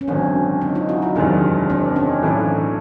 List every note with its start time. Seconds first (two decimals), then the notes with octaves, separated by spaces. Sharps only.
0.01 C#4
0.08 G#1 F#2 D3 C4 D4
0.61 C#4 D#4
0.75 D#4 F4
0.89 E4 F#4
1.02 D#4 F4
1.16 F#1 E2 C3 D#3 G#3 C4 D4
1.70 C4 D4
1.96 C#4 D#4
2.22 B1 A2 E3 A3 D4